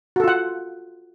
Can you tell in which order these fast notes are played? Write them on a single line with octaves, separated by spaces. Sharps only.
F#4 A4 F4 F#5